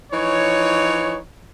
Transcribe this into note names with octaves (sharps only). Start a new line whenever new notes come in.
E3 F3 D#4 C#5